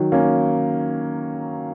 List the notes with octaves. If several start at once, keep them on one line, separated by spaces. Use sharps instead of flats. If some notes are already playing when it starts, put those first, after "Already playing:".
Already playing: D#3 F#3
A#3 C#4